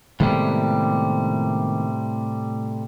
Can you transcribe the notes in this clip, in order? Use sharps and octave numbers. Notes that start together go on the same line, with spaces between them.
A2 C3 D#3 G3 G#3 B3